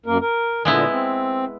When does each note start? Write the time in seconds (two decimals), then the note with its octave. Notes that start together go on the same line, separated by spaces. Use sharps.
0.06 F#2 A#3 A#4
0.21 A#4
0.65 A#2 D3 G#3 B3 E4
0.91 C4